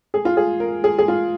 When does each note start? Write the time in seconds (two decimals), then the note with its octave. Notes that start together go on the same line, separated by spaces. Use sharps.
0.14 G#4
0.25 F4
0.37 G#4
0.60 A#4
0.84 G#4
0.98 G#4
1.08 F4